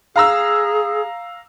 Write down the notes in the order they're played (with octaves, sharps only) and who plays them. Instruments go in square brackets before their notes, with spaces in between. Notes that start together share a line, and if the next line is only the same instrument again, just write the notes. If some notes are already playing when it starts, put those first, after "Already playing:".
[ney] G#4 [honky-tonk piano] F5 A#5 E6